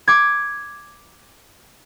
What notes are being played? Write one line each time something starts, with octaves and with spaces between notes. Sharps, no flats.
D6 G#6